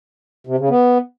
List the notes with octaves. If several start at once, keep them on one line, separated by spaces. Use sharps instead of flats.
C3
C#3
B3